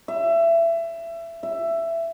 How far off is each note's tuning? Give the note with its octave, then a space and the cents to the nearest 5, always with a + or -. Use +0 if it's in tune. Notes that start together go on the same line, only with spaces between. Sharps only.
E5 +25
E5 +15